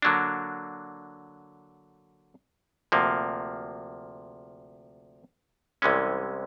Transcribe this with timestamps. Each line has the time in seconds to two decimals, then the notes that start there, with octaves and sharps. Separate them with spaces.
0.02 D3 F#3 A#3 D4
2.92 D2 C3 F3 A#3
5.82 C2 C3 E3 G#3 C#4